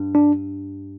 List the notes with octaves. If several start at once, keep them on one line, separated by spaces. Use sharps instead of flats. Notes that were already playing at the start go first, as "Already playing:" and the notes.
Already playing: G2
D4